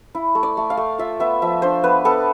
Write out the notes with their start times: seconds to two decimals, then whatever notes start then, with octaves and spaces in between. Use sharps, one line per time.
0.15 E4
0.35 A3
0.43 D5
0.57 A3
0.70 F5
0.77 A3
0.98 F4 E5
1.20 B3 E5
1.42 F3 E5
1.62 D4 C5
1.84 B3 B4
2.05 B3 A4